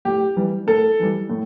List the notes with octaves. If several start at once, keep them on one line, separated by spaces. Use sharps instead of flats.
A2 G4
E3 G3
A2 A4
E3 G3
A2